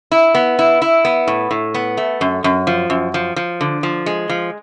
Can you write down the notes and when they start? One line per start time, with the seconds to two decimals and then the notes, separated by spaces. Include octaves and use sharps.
0.12 E4
0.35 B3
0.59 E4
0.82 E4
1.05 B3
1.28 A2
1.51 A2
1.75 B3
1.97 A3
2.21 F#2
2.44 F#2
2.67 F3
2.90 F#2
3.14 F3
3.36 F3
3.61 D3
3.83 F3
4.06 G#3
4.30 F3